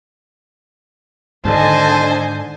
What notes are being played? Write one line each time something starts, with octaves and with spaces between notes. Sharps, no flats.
G#2 D3 D#3 C5 D#5 G#5 A5